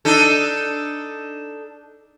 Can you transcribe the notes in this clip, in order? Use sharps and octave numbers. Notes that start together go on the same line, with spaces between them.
D4 D#4 A4